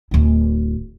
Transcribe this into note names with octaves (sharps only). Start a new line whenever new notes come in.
D1 E4